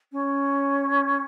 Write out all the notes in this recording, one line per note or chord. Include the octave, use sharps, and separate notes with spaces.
C#4